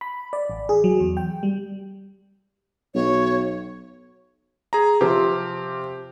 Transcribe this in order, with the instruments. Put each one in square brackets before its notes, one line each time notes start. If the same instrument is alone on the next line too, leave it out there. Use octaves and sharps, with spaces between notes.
[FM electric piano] B5
D5
A1
G#4
F#3
E2
G5
G3
[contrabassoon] B1 [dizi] C#5
[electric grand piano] G#4 A#5
[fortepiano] C3 F3 C4 [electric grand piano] G4